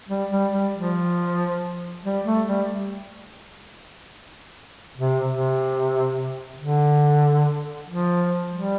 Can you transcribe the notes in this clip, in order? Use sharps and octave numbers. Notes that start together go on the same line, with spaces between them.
G3
G3
G3
F3
G3
A3
G3
C3
C3
D3
F3
G3